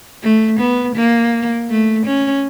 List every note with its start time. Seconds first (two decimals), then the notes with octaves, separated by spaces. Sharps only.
0.22 A3
0.59 B3
0.95 A#3
1.70 A3
2.06 C#4